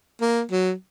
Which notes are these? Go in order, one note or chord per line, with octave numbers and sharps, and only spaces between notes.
A#3
F#3